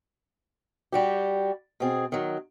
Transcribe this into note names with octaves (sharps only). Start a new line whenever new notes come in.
G3 F#4 G4
B2 C4 G#4
D#3 F#3